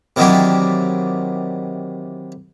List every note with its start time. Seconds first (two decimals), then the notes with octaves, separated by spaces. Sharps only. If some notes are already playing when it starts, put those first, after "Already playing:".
0.16 C3 D#3 E3 F#3 D4 G4